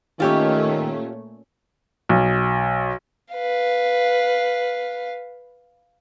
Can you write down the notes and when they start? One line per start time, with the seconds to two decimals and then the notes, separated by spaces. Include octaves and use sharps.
0.20 A#2 D#3 A3 C#4 F4 G4 C#5
2.09 B1
3.34 B4 F5